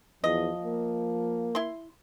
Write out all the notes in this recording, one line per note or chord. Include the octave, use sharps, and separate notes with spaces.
E2 F3 D#5
A#3
E4 C6